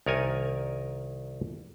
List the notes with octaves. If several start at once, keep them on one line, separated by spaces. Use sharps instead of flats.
C2 D#3 A#4 C#5 D5 G#5